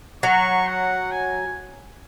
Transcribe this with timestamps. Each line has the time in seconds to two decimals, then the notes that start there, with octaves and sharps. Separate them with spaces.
0.23 F#3 C#6
0.67 F#5
1.11 G#5